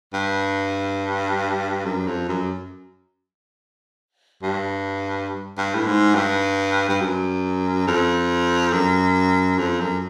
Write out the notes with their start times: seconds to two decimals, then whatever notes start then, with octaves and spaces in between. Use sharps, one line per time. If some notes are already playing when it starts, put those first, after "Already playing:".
0.14 G2
1.86 F#2
2.07 F2
2.29 F#2
4.43 G2
5.58 G2
5.75 A2
5.87 G#2
6.15 G2
6.89 G2
7.01 F#2
7.87 F2
8.73 F#2
9.59 F2
9.81 F#2